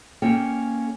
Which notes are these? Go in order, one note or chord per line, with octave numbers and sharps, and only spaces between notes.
A#3 C#4 A4 G5